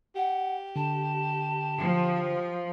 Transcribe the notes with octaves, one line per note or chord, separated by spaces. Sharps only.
G4 F#5
D3 A5
F3